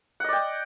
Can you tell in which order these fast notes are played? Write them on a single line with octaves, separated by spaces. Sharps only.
F#5 D#5 D5 G5